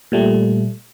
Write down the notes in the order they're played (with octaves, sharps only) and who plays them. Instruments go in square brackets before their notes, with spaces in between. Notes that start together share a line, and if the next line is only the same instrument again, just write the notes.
[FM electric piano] A#2 G3 A3